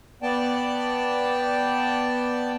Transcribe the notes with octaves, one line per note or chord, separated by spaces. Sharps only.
B3 D5 G5 A5